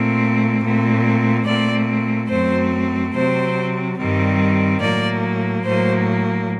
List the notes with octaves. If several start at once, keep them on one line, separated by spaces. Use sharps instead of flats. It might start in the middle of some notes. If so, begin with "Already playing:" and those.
Already playing: A#2 A3 C4
A#2 A3 C4
A#2 A3 C4 D5
F#2 F#3 A3 C4 C5
C3 F#3 C4 C5
G2 D#3 G3 C4
A2 F#3 A#3 D5
A2 F#3 A#3 C5